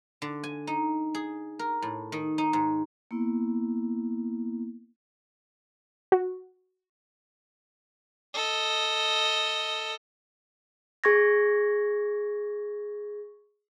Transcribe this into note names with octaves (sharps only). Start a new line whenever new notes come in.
D3
G#5
D#4
G#4
A#4
A2
D#3
D#4
G#2
A#3 B3 E4
F#4
A4 D#5
G#4 C#6 G#6 A#6